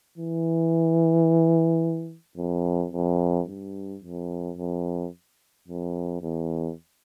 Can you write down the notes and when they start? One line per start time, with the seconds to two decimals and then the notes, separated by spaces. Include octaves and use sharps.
0.18 E3
2.37 F2
2.93 F2
3.48 G2
4.03 F2
4.58 F2
5.68 F2
6.22 E2